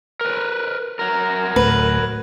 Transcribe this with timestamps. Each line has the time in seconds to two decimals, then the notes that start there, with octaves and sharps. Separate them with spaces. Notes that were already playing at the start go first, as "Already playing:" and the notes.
0.21 A#4 B4
0.99 F#3 A#4
1.56 D1 A3 B4